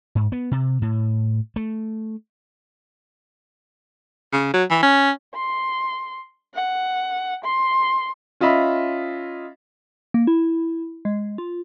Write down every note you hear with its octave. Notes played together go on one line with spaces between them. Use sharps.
G#2
B3
C3
A2
A3
C#3
F#3
E3
C#4
C6
F#5
C6
C#4 F4 D#5 E5 B5
A#3
E4
G#3
F4